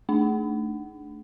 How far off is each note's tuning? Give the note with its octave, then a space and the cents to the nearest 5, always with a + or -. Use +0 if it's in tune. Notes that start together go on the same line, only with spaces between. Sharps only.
A3 +0 D4 +0